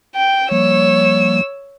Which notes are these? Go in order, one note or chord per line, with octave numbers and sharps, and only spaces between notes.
G5
F3 G3 A#3 C#5 E6